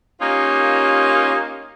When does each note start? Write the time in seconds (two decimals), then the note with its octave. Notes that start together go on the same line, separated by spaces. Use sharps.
0.21 A#3 C#4 D#4 F4 G4 A#4